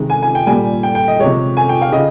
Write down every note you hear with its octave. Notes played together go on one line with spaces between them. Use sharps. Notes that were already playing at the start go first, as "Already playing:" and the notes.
Already playing: C3 D#3 G#3
G#5
G#5
G5
A#2 G3 G#5
G5
G5
D#5
C3 F3 G#3 C#5
G#5
G5
F5
C#3 D#5